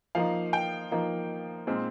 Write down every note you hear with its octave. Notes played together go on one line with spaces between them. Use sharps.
F3 A#3 D#4 F5
G5
F3 A#3 D#4
A#2 G#3 C4 D#4